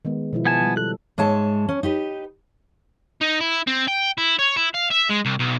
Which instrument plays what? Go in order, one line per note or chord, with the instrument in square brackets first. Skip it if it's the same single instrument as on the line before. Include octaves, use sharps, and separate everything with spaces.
[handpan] D#3 G#3 B3
B2 F3 E4
[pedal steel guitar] B3 G#5 A5
[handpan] G3
[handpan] A4 [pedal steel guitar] F#6
[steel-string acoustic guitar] G#2 G#3 C#5 E5 A5
C#4
D#4 G4 B4
[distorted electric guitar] D#4
E4
C4
G5
E4
C#5
E4
F5
E5
G#3
C2
B1